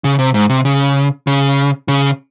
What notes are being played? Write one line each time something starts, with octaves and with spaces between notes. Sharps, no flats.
C#3
C3
G#2
C3
C#3
C#3
C#3